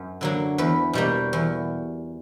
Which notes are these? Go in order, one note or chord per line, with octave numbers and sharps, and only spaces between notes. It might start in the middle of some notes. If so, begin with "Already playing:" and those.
Already playing: F#2
D3 F#3 A#3
E2 B4
B2 G3 A#3
E2